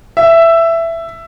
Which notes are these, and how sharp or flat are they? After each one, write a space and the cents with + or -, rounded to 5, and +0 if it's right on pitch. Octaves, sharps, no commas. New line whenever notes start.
E5 +10